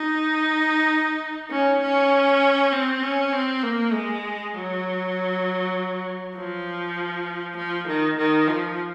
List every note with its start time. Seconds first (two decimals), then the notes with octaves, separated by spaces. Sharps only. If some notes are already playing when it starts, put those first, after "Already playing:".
Already playing: D#4
1.50 C#4
1.81 C#4
2.72 C4
3.02 C#4
3.32 C4
3.63 A#3
3.93 G#3
4.53 F#3
6.36 F3
7.56 F3
7.87 D#3
8.17 D#3
8.47 F3